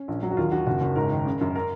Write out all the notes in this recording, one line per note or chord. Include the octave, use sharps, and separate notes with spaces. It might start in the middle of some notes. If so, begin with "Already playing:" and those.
Already playing: C#4
A#1
F#3
F#4
D#2 F4
D#2 F#4
F#1 F#4
F#1
G#2 A#4
D#3
C#3
F#2
A#4